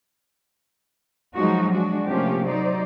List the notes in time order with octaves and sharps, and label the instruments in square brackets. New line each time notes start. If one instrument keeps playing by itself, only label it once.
[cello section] F3 F#3 G#3 D#4 F#4
G#3 D4 F#4
C3 F3 A3 A#3 C#4 G4
F#3 D#4 C5 D5